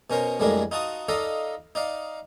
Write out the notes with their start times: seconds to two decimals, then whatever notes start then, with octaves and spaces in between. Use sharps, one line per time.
0.10 B2 C#4 A#4 C5
0.40 F2 A2 G3 G#3 D4 A#4
0.71 D#4 F4 F#4 A5 D#6
1.09 D#4 F4 A4 D5 D#5 F5
1.75 D#4 D5 F5